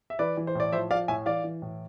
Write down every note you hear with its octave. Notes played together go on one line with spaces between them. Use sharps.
E5
E3 B4 D5
E3
C5
A2 D5
F3 C5 E5
F3 D5 F5
A2 E5 G#5
E3 D5 F5
E3
A2